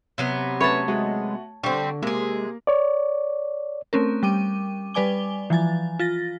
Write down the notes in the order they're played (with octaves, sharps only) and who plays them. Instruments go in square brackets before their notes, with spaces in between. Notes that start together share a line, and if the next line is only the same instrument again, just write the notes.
[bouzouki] C3 F#3 B3
[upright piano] A3 C#4 B4 [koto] C#5 A5
[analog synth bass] G#3 [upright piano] A3 F#4
[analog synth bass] D3 [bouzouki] G3 C4 [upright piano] C#6
[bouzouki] C3 G#4 [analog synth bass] G#3 [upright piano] A#3
[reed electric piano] C#5 D5
[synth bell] A3 C4 C#4 A#4
G3 G5 D6 D#7
G3 B4 D5 G#5 D6 G7
E3 F3 G#5 A6
F4 A6 A#6